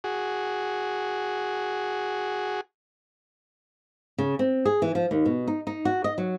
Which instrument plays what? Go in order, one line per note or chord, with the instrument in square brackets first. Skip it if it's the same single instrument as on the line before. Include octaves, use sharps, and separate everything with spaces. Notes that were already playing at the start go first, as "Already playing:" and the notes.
[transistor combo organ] F#4 G#4
[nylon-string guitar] C#3
C4
G#4
E3
F3
D#2
B2
D#4
D#4
F#4
D#5
F#3